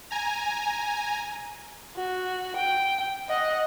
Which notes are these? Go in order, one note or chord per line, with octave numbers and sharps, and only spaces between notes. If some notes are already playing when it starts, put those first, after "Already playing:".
G#5 A#5
F#4
G5
D#5 F#5